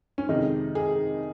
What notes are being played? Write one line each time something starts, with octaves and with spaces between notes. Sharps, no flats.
C#4
F2 C3 D#3 G#3 D#4
G#4